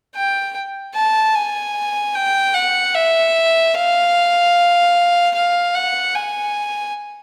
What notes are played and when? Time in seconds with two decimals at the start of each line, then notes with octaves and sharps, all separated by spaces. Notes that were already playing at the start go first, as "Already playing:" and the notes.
0.15 G5
0.95 A5
1.35 G#5
2.15 G5
2.55 F#5
2.95 E5
3.75 F5
5.35 F5
5.75 F#5
6.15 G#5